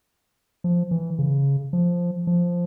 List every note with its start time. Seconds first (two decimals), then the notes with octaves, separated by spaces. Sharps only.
0.64 F3
0.91 E3
1.19 C#3
1.73 F3
2.27 F3